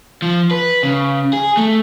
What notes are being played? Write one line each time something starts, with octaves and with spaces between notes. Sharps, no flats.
F3
B4
C#3
G#4
A3